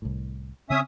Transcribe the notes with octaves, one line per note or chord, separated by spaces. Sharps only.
C2 A2
C#3 C4 C#4 E5 D#6